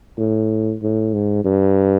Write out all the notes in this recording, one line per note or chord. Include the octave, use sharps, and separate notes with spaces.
A2
A2
G#2
G2